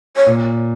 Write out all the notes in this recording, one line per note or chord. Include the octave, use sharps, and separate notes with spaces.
C#5
A#2